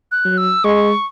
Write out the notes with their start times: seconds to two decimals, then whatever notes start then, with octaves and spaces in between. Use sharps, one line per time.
0.12 F#6
0.25 F#3
0.38 E6
0.64 G#3 C#6